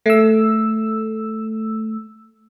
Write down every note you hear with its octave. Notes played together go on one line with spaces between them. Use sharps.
A3 E6